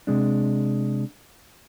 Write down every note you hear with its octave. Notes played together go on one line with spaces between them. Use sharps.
C3 G#3 D4